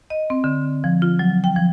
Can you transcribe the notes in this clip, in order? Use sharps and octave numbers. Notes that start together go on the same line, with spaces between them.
D#5
C4
D3
F3
F4
F#3
G5
F3